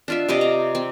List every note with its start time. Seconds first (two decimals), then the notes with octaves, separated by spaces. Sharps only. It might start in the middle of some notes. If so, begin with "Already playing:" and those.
0.08 D4 F4 E5
0.28 C3 G4 D5 D#5
0.41 A#5
0.75 C4